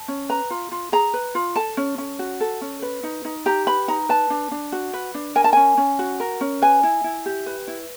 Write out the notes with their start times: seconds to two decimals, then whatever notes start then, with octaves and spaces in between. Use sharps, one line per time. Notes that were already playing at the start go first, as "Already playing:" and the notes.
Already playing: A5
0.08 C#4
0.29 B4 A#5
0.50 F4
0.72 F4
0.92 G#4 A#5
1.14 B4
1.35 F4
1.56 A4 A5
1.77 C#4
1.98 C#4
2.19 F#4
2.41 A4
2.61 C#4
2.82 B4
3.03 D#4
3.25 D#4
3.46 G4 A#5
3.66 B4 B5
3.88 D#4 A#5
4.09 B4 A5
4.30 D4
4.51 D4
4.72 F#4
4.94 B4
5.14 D4
5.35 A#4 G#5
5.44 A5
5.53 C#4 G#5
5.77 C#4
5.99 F#4
6.20 A#4
6.41 C#4
6.62 B4 G#5
6.83 E4
7.04 E4
7.26 G4
7.46 B4
7.68 E4